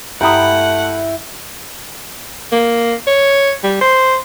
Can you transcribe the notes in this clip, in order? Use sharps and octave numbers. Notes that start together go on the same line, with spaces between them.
G2 A3 E4 F#5 G5 A#5 D#6
A#3
C#5
G3
C5